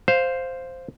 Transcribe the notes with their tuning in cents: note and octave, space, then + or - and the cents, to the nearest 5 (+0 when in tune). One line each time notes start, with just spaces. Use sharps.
C5 +0 F5 +0